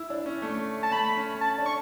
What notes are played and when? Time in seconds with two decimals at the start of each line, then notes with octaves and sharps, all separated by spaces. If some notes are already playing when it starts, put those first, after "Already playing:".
Already playing: E4
0.10 D4
0.26 C#4
0.42 A3
0.83 A5
0.91 A3 B5
1.17 C#4
1.41 A5
1.58 D4
1.66 C#6